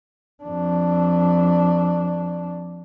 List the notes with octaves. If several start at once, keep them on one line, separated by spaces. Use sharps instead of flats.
F2 D4